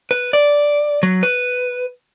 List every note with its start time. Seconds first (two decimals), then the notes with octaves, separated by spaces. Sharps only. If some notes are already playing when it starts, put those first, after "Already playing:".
0.11 B4
0.33 D5
1.03 F#3
1.23 B4